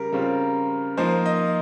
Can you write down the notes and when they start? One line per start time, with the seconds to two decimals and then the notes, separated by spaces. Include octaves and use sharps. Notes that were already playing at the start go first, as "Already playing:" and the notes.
Already playing: C#3 G3 A#4
0.12 C#3 G3 C4 F4
0.97 F3 A#3 D#4 C5
1.26 D#5